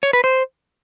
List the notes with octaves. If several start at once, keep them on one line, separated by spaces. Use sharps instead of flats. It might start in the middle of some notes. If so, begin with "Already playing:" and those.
C#5
B4
C5